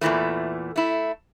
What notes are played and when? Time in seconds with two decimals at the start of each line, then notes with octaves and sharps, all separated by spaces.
0.01 E2 A#2 C#3 E3 A3
0.76 A3 E4